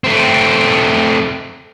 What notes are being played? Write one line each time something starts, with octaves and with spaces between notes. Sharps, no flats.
A3 C4